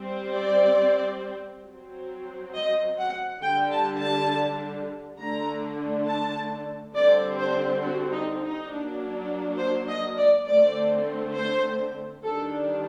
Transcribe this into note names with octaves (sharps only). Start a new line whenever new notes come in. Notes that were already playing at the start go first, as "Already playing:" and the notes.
Already playing: G3 C4
D5
F#3
C4
D#5
F#5
D3 G3 D4 G5
A5
A5
D3 A3 D4 A#5
A5
D3 G3 C4 D5
C5
F#4
D#4
D#4
F#3 A#3 D4
C5
D#5
D5
D3 A3 C4 D5
C5
D#3 G3 D4 A4